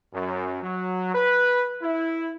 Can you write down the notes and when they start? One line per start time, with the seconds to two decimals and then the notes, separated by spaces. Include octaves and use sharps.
0.14 F#2
0.63 F#3
1.15 B4
1.82 E4